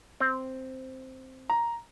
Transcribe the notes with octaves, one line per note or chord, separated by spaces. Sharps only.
C4
A#5